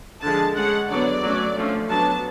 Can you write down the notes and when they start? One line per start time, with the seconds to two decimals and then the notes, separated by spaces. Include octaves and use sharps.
0.23 D3 F3 G#3 A5
0.56 G#3 C#4 F#5
0.90 D3 F#3 B3 D5
1.23 F#3 A3 C#4
1.56 D3 F3 A3 C#4
1.89 F#3 B3 D4 A5